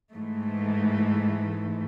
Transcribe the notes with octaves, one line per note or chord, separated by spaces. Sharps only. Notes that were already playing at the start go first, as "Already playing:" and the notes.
G#2 E3 A3